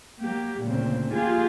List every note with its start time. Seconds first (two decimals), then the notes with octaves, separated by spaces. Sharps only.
0.20 F#3 A#3 G4
0.63 D2 A#2 C#3 A#3 C4
1.11 A#3 F4 G4 G#4